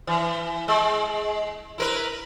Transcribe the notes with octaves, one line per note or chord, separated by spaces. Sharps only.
E3
G#3
E4 A#4 B4